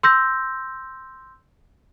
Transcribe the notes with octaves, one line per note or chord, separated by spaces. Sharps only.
C6 E6 G6 A#6